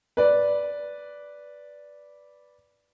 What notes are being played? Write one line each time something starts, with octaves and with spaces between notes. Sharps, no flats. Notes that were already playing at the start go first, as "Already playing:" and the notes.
B4 D5